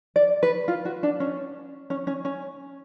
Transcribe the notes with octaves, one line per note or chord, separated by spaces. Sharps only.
D5
B4
F4
F#4
D4
C#4
C#4
C#4
C#4